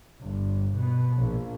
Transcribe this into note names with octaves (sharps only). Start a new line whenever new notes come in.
G1
B2 B3
A#1